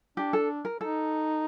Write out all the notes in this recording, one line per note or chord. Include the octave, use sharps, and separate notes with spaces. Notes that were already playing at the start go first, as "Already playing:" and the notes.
D4 G4
A4
A#4
D#4 A4